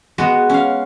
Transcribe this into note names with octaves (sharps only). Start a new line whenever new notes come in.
G#3 B3 F#4
C#4 F5